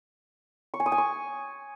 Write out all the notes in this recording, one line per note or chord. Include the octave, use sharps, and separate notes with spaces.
C#6
G#5
D#6
G#5
C#6